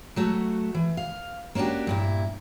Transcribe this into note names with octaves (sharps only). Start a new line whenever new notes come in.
F#3 A3 F#4
E3
F5
A#3 C#4 D4 F#4 G4
G2 A#2 E4